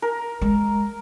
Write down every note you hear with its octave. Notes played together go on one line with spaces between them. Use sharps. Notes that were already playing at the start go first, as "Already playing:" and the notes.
A#4
G#3